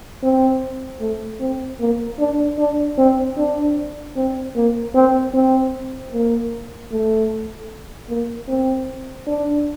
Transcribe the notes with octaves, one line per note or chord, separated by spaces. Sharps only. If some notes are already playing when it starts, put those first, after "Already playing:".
C4
A3
C4
A#3
D4
D4
C4
D4
C4
A#3
C4
C4
A#3
A3
A#3
C4
D4